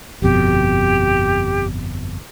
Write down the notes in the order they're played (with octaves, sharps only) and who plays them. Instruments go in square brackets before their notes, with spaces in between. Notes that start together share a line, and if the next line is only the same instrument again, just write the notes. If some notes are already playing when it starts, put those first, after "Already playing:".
[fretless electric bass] G1 F2 B2 [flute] G4